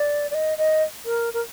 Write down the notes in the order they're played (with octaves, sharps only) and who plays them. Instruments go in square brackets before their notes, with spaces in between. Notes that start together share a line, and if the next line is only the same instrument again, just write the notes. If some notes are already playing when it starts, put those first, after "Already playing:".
Already playing: [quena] D5
D5
D#5
D#5
A#4
A#4